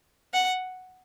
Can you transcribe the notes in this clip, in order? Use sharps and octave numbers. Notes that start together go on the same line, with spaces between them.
F#5